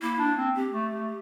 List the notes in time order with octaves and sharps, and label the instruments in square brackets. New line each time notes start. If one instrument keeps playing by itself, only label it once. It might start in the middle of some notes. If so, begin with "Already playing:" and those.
[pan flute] A#3 [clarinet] E4
[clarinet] D4
C4
[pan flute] G4
[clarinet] A3
A3